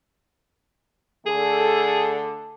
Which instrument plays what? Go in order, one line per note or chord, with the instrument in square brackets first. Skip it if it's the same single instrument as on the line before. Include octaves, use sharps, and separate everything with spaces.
[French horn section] D3 A3 A4 [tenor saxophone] G#4